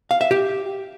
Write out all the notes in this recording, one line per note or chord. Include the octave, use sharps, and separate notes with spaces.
F5
E5
G4